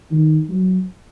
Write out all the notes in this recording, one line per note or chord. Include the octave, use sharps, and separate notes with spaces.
D#3
F#3